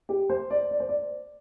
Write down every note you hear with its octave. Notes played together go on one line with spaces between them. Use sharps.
G4
C5
D5
D5
C5
D5